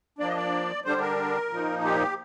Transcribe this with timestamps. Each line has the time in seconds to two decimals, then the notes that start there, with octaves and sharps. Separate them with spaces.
0.18 F3 A#3 D4 D5
0.28 D#5
0.37 D5
0.85 D3 G3 D4 C5
1.01 A#4
1.50 A#2 F3 A#3 D#4
1.85 G4